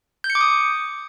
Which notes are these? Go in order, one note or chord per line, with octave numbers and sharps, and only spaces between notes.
G6
C#7
D6
D#6